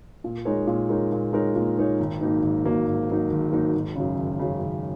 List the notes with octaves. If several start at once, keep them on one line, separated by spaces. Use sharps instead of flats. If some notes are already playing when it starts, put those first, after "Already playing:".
A#2
G#3 D#4 A#4 C#5
A#2
G#3 D#4 A#4 C#5
A#2
G#3 D#4 A#4 C#5
A#2
G#3 D#4 A#4 C#5
G#1
G#2 F#3 A#3 D#4
G#1
G#2 F#3 A#3 D#4
G#1
G#2 F#3 A#3 D#4
G#1
G#2 F#3 A#3 D#4
G#1
F#2 C#3
G#1
F#2 C#3
G#1